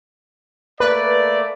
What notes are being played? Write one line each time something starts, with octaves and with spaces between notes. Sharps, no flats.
A3 A#3 B4 D5